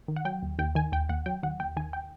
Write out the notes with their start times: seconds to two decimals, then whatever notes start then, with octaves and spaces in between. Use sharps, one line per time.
0.08 D#3
0.16 F#5
0.25 F#3 G5
0.43 D#2
0.59 D#2 G5
0.75 D#3 G#5
0.92 D#2 G5
1.09 D#2 F#5
1.26 F#3 G5
1.43 D#2 F#5
1.60 D#2 G5
1.77 D#3 G#5
1.93 G5